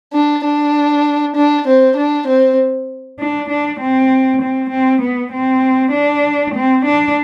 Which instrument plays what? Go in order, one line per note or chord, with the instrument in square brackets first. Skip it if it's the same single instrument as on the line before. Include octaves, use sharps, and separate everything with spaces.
[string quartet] D4
D4
D4
C4
D4
C4
D4
D4
C4
C4
C4
B3
C4
D4
C4
D4